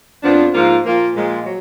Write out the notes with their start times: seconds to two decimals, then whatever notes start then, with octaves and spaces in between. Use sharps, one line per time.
0.23 F2 F3 B3 D4
0.53 G#2 F3 A#3 F4 A#4
0.84 A#2 F3 A#3 F4
1.15 A#2 F3 G#3
1.45 F#3